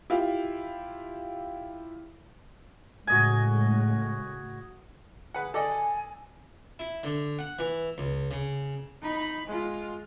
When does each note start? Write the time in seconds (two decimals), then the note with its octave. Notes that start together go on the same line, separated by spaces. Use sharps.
0.10 E4 F4 G4
3.07 A2 C#3 G#3 F#4 D#5 G#5
5.34 G#4 B4 F#5
5.54 A4 D5 D#5 G#5
6.79 E4
7.03 D3
7.39 F#5
7.59 E3
7.98 C#2
8.31 C#3
9.02 D#4 B5
9.47 G#3 F4